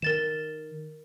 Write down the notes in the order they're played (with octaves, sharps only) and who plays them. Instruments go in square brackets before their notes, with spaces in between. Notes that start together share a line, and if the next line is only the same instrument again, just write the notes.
[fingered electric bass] D#3 [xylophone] A#4 A6 E7